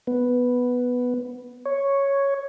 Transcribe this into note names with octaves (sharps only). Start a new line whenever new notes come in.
B3
C#5